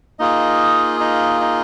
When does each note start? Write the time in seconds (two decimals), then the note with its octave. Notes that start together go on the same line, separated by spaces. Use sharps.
0.19 A#3 D#4 F4 G#4 D#5
1.00 D#4 D#5
1.41 D#4 D#5